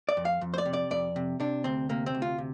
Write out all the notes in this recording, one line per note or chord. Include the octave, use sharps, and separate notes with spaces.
D5
F2
F5
F2
C5
D5
C3
D5
F2 D5
C3
C3 D4
D2 C4
C3 A#3
C4
D2
F4
C3